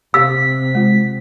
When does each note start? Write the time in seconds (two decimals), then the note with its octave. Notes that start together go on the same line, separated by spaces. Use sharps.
0.14 C3 C4 G4 F5 E6 B6
0.75 G#3 F4